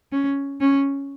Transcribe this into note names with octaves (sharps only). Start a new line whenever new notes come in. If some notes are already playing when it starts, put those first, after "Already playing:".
C#4
C#4